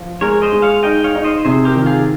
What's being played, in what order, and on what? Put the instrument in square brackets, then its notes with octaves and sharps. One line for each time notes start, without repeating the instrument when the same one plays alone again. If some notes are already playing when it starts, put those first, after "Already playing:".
Already playing: [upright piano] F3
[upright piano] G#3 [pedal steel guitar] A#4 C#5
[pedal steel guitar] C5 D#5
[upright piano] G#3
[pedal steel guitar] C#5 F5
[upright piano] D#4 [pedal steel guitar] D#5 G5
[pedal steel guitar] C#5 F5
[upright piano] D#4
[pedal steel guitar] C5 D#5
[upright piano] C3 [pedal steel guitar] G#4 C5
[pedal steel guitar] G4 A#4
[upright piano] D#3
[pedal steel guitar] F4 G#4